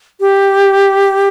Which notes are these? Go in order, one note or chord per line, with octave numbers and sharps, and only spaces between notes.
G4